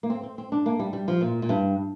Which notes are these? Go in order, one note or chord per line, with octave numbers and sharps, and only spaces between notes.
A#3
C4
C4
C4
D4
A#3
G3
G3
F3
A#2
A#2
G2